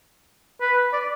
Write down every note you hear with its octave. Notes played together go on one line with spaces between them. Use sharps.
B4
D5